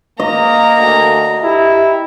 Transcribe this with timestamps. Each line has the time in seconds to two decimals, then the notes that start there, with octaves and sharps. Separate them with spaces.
0.20 A#3 D#5 A#5
0.78 D2
1.44 E4 G4